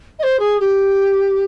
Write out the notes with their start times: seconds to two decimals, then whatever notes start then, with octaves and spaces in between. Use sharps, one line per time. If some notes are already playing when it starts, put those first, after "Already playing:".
0.19 D#5
0.23 C5
0.39 G#4
0.60 G4